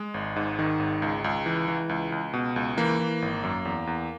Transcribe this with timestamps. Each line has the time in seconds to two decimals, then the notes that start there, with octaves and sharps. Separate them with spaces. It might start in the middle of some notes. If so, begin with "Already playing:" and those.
Already playing: G#3
0.14 G#1
0.36 G#2
0.59 D#3
0.79 G#1
1.02 C#2
1.24 C#2
1.46 E3
1.68 E3
1.89 C#2
2.12 C#2
2.33 B2
2.56 C#2
2.77 E3 A#3
3.00 E3
3.22 G#1
3.43 F#2
3.65 E2
3.87 E2